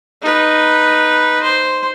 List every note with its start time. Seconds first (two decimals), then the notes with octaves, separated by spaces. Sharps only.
0.22 D#4 B4
1.43 C5